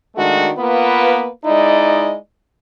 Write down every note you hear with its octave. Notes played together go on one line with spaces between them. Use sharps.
D#3 G#3 A3 D4 F#4
A#3 B3 F4 B4
G#3 D#4 E4 D5 D#5